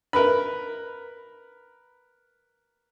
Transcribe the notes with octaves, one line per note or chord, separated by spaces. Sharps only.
A#4 B4 B5